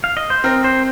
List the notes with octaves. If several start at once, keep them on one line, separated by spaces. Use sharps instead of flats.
F5
D#5
C5
C4 A#4
C5